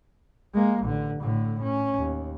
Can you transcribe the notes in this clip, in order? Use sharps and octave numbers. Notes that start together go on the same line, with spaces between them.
G#3 A#3
A1 D3
A2 D3
C#4
D#2